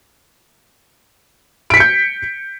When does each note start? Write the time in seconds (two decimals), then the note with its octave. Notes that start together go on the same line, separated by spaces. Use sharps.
1.70 D7
1.74 B6
1.77 C#7
1.80 G6